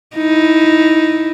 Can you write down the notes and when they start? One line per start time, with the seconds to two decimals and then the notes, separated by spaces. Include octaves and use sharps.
0.17 D#4 E4